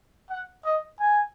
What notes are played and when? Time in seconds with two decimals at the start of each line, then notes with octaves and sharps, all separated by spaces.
0.30 F#5
0.65 D#5
1.00 G#5